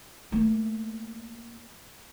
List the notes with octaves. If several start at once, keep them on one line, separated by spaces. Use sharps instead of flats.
A3 A#3